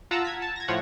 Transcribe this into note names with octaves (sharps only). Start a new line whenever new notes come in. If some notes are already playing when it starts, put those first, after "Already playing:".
F4 F#5 A5 A#5 E6
G#6 B6
A5
G#6 A#6
A2 F3 C#5 F#5